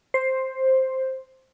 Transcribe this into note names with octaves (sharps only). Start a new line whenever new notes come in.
C5